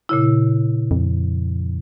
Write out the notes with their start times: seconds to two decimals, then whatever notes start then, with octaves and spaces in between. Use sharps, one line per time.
0.09 A#2 C#3 E4
0.91 F2